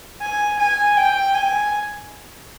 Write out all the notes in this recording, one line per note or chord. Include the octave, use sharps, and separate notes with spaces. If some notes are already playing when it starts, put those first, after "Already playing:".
G#5
G#5
G5
G#5